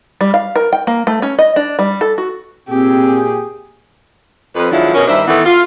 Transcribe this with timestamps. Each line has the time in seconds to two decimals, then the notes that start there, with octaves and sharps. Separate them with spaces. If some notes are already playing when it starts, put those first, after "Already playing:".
0.21 G3
0.34 F5
0.56 A#4
0.73 G5
0.87 A#3
1.07 A3
1.22 C#4
1.39 D#5
1.56 D4
1.79 G3
2.01 A4
2.18 F#4
2.69 A#2 C4 G4 G#4
4.56 F2 B4
4.71 D#3 F3 F#3 G#3 D4 E4
4.95 B2 C#4 A#4
5.08 G2 D#3 D4 E4 C5 E5
5.27 D#3 E3 A3 B3
5.46 F4